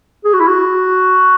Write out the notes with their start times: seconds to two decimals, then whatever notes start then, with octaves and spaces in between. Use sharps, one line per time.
0.25 G#4
0.33 F#4
0.40 E4
0.47 F#4